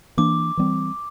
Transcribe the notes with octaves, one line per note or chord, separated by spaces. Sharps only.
E3 A#3 D4 D6
E3 G3 C4